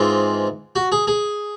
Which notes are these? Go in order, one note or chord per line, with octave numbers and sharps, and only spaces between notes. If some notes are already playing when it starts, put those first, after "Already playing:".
Already playing: G#2 E3 G#3 C4 F4
F#4
G#4
G#4